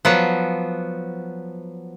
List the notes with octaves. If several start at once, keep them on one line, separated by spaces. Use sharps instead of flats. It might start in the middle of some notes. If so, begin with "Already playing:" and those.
F3 F#3 B3